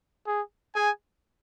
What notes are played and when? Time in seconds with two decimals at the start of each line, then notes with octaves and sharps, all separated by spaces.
0.27 G#4
0.75 G#4 G#5